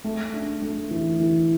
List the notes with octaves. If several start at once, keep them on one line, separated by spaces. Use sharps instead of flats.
A3
D4
A3
E3
E3